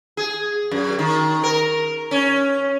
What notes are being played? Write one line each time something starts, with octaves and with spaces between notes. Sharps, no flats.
G#4
F#2
D#3
A#4
C#4